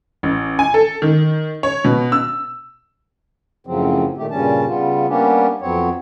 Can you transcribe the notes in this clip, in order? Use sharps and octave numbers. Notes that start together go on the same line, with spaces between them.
A1
G#5
A4
D#3
C#5
B2
E6
F#2 A2 C#3 F3 F#3 C4
A#2 D#3 A3 G4
G2 A#2 C#3 G3 C#4 A5
C#3 G3 B3 F4
G3 A#3 B3 C#4 D4 G4
F2 F#3 B3 C4 C#5